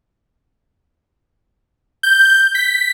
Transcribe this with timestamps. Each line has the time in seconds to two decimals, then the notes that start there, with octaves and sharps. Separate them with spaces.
2.03 G6
2.55 B6